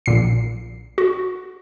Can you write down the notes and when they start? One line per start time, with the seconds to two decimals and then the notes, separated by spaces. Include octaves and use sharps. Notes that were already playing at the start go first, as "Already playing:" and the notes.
0.06 A#1 A#2 C7
0.98 F#4